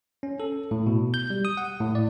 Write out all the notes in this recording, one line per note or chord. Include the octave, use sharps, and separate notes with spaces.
C#4
A4
A2
B2
G6
G3
D#6
F#5
A2
D5